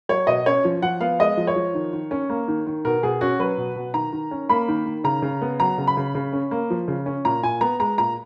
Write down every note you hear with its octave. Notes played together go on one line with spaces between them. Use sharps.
F#3 C#5
B2 D#5
C#4 C#5
F3
F3 F#5
B3 F5
G#3 D#5
F3
C#5
F3
D#3
D#3
C#4
A#3
D#3
D#3
B2 A#4
B2 G#4
C#4 F#4
F#3 B4
B2
B2
D#3 A#5
D#3
C#4
A#3 B5
D#3
D#3
C#3 A#5
C#3
B3
F#3 A#5
C#3
B5
C#3
C#3
C#4
A#3
F3
C#3
C#4
A#2 A#5
A#2 G#5
B3 A#5
G#3 A#5
A#2 A#5